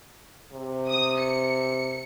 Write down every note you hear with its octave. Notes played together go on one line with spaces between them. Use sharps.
C3
D#6
C#7